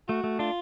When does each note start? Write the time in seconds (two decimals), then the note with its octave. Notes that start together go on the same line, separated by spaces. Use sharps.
0.08 A3 F#4
0.24 A3
0.39 D4 F4